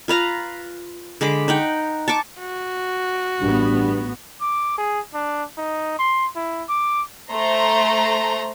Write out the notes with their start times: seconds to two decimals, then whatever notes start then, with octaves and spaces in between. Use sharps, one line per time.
0.08 F4 B4 F5 A#5
1.21 D3 G#3 B5 D6
1.48 D#4 F#5 G5
2.08 A5 C#6 D6
2.40 F#4
3.42 A1 G2 B3
4.41 D6
4.78 G#4
5.14 D4
5.58 D#4
5.99 C6
6.36 E4
6.69 D6
7.32 A3 C5 A#5 C6